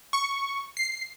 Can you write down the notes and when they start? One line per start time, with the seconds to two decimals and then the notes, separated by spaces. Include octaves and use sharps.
0.13 C#6
0.77 C7